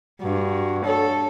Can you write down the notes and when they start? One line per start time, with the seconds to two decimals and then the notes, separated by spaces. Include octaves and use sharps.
0.22 G2 F#4
0.85 A4 C#5